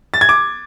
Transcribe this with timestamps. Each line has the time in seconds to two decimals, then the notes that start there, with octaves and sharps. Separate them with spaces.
0.14 A6
0.21 G#6
0.29 D6